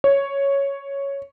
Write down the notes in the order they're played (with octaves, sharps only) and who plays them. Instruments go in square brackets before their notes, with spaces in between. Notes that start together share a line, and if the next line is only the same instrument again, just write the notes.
[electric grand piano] C#5